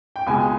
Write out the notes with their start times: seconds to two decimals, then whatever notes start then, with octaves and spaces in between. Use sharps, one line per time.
0.16 G5
0.27 C#2 B2 G#3 G#5